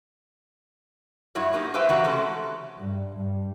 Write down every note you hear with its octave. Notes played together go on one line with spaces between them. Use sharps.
G2 F#3 E4 F#4 C#5
F#3 A#3 D#4 G4
G4 B4 C5 E5 F5 G5
C#3 E3 F#4 G4 F#5 A#5
C3 G#3 A3 C#4 A4
G2
G2